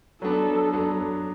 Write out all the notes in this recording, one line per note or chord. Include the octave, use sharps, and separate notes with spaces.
F#3 B3 D4 A4
F#3 B3 D4